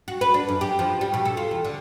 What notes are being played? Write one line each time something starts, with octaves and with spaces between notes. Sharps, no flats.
F#4
B4
D4
F#2
G4
F3
G3
B2
A4
F4
E2
D3